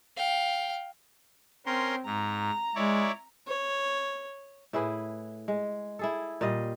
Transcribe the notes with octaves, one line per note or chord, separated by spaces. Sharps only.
F5 G5
C4 C#4 A#4 C6
G#2 A#5
G#3 E4 C#5 D5
C#5
A2 E4 G#4 B4
G#3
E4 G#4 A4
A#2 G3 D#5 F5